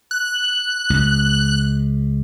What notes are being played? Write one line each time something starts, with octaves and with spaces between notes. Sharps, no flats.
F#6
C#2